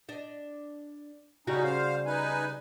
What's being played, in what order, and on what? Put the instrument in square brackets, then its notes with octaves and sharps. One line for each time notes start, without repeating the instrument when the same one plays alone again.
[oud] D4 D#5
[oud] C#3 G3 F#4 [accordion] C#4 D#4
[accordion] C5 F5
D#4 B4 G#5